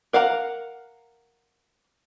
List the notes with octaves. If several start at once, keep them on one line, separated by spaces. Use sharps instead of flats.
A#4 F5 F#5 A#5